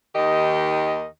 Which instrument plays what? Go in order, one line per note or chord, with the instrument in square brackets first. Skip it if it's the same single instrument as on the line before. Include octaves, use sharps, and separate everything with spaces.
[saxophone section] D#2 D#3 G4 D#5